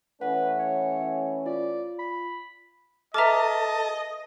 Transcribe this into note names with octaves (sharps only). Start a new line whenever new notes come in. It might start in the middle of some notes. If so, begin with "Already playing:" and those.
E3 A3 C#4 B4 F#5
C#5
F4 D5
B5
A4 B4 D#5 E5 A5 A#5 D6 F6